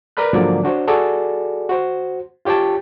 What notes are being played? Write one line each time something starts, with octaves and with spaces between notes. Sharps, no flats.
A#4 B4 D5 B5 F#6
G#2 D3 F3 F#3 A#3 D5
D4 F#4 C5 C#5
F#4 G#4 A4 D5
F#4 C5
F4 G4 C#5 G5 A5